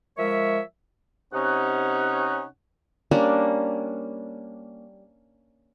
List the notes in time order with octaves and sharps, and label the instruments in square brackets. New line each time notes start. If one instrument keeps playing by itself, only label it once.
[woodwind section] F3 G#3 A#4 C#5 E5
C3 C#4 D#4 F#5
[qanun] G3 A#3 C#4 D4